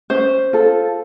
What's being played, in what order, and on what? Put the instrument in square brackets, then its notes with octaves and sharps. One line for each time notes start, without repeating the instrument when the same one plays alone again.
[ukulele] C#4 C5
F4 A4